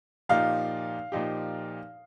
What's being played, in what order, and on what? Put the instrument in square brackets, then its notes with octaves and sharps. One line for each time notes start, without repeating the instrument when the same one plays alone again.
[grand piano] A#2 F3 D#4 G4 [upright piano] F5
[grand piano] A#2 F3 D#4 G4